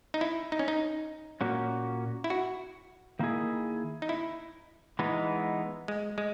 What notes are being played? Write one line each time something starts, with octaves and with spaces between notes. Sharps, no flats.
D#4
E4
D#4
C#4
D#4
A#2 A#3 C#4 F#4
E4
F#4
D#3 A#3 E4 G#4
D#4
E4
E3 G#3 B3 D#4
G#3
G#3